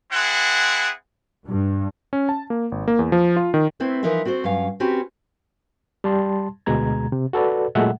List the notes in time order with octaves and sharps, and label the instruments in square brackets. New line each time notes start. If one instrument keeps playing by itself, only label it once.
[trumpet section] C4 E4 G#4 F#5
[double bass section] G2
[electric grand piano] C#4
A5
A#3
G#1
A#3
E2
F3
F4
D#3
[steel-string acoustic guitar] A3 C4 E4 B4 C5
E3 F3 D#4 A#4 B4 E5
C4 F#4 A4 C5
G2 F#3 C#4 F5
C4 C#4 F#4 G4 B4
[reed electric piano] G3 A5 C6
D2 B2 G#3 A#5 G#6
C3
F#4 A4 B4 D5
A#2 F#3 G#3 A3 E5 F#5